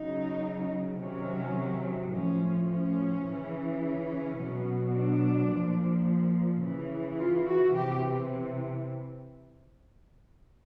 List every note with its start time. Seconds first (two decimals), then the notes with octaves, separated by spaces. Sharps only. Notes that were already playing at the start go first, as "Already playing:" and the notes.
Already playing: C#3 F#3 D#4
1.00 C3 D#3 F#3 C#4
2.12 A2 F3 C#4
2.69 C#4
3.24 C#3 E3
3.81 C#4
4.37 B2 F#3
4.94 D4
5.50 A#2 F3
6.61 C#3 E3
7.18 F4
7.46 F#4
7.75 C3 E3 G4